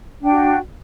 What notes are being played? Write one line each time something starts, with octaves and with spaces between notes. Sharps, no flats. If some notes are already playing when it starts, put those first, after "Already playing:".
D4 F#4 G5